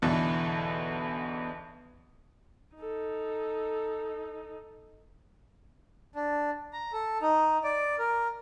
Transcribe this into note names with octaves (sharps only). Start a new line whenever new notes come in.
B1 E2 D3 E3
D#4 A4
D4
A#5
A4
D#4
D5
A#4